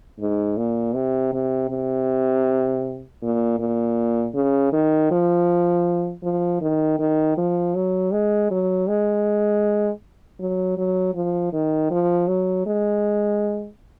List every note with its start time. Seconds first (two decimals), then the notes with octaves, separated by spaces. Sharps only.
0.20 G#2
0.57 A#2
0.95 C3
1.33 C3
1.70 C3
3.22 A#2
3.59 A#2
4.35 C#3
4.73 D#3
5.11 F3
6.23 F3
6.61 D#3
6.99 D#3
7.38 F3
7.75 F#3
8.12 G#3
8.51 F#3
8.88 G#3
10.40 F#3
10.78 F#3
11.15 F3
11.53 D#3
11.91 F3
12.28 F#3
12.66 G#3